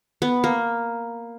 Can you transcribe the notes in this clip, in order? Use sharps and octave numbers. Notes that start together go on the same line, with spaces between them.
B3
A#3